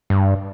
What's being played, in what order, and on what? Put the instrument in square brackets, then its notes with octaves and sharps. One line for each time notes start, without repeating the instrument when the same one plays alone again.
[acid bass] G2